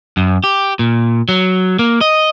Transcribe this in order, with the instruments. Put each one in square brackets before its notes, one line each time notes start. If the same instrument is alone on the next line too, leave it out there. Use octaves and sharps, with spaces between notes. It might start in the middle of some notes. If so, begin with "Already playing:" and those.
[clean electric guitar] F#2
G4
A#2
F#3
A#3
D#5